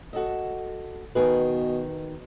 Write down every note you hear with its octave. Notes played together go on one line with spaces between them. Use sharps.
F#4 A4 D#5
B2 D#3 G#4 B4